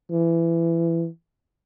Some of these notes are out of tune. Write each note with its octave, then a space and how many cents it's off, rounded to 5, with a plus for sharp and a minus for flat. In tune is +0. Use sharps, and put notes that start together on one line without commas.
E3 +20